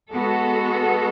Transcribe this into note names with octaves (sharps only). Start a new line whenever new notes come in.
G#3 B3 F#4 A4